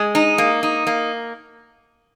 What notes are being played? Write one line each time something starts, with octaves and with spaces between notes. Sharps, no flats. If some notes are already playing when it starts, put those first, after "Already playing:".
Already playing: G#3
D#4
A#3
D#4
A#3